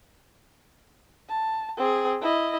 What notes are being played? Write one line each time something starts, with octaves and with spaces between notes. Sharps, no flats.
A5
C4 G#4
E4 D#5